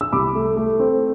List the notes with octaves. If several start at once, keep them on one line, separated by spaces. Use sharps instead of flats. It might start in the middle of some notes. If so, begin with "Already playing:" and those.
E6
C2 B5 D6
A3
A3
C4